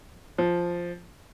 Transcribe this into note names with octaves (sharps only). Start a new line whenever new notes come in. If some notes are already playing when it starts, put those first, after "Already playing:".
F3